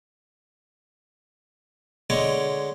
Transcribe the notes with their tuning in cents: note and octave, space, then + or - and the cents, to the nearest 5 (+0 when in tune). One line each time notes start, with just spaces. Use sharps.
D3 +0 G#3 +0 C#5 +5